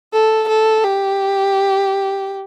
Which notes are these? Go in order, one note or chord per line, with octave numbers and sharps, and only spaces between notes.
A4
A4
G4